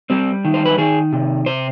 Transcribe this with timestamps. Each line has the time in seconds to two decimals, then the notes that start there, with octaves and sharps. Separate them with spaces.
0.10 G3 C4
0.45 D#3
0.54 C5
0.66 B4
0.78 D#3 G#4
1.13 C3
1.46 C3 C5